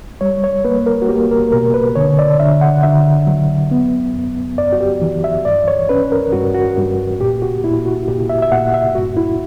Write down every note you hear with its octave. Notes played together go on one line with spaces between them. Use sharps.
G3 C#5
C#5
A#3 B4
A#4
F#4
A#3 G4
A#4
B2 A#4
B4
D3 C#5
D5
D3 E5
F#5
D3 E5
F#3
B3
F#2
F#2 D5
F#4
G4
E3
E5
G2 D5
C#5
C#4 B4
A#4
G2 F#4
F#4
G2
A#2 G4
F#4
A#2 E4
F#4
A#2 G4
E5
E5
A#2 F#5
E5
G2 F#4
E4